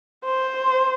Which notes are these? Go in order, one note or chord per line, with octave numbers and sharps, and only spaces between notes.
C5